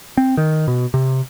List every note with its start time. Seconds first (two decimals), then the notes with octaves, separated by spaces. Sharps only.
0.17 C4
0.37 D#3
0.68 B2
0.94 C3